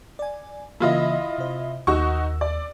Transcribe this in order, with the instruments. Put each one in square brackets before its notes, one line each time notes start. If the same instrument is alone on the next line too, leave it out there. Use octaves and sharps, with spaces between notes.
[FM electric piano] D5 G#5
[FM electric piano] C#3 E3 A#3 [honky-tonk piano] E4 F4 D#5
[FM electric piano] C3 C5
[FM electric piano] D#2 E6 [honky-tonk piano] D#4 F#4 C#6
[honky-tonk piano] D5